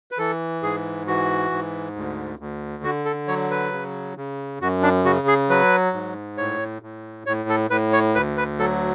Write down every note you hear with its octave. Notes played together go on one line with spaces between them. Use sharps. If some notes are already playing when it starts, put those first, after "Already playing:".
B4
E3 A4
G#2 G#4
E3 F#4
G#2
D2
D2
D3 F#4
A4
F#3 C#5
B4
C#3
C#3
F#2 F#4
D4
C#3 F#4
G#4
F#3 B4
G#2
A2 C#5
A2
A2 C#5
A4
A2 B4
C#5
D2 B4
B4
F#3 A4